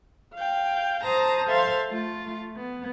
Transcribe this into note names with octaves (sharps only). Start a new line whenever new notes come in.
F5 G5
C5 A5 A#5 D#6
A4 C5 E5 F5 C6
A3 F4
B3